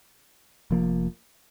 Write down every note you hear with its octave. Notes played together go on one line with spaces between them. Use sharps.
F1 F2 F3 A#3